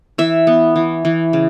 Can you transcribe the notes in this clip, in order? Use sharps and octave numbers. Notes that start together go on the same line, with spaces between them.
E3 E5
B3
E3
E3
C#3